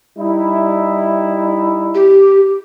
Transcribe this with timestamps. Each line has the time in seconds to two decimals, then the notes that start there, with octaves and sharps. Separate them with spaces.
0.17 G3 D#4 E4
1.95 G4